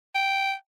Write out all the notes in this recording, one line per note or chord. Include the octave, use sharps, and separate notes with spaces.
G5